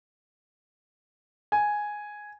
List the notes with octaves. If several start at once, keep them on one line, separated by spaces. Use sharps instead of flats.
G#5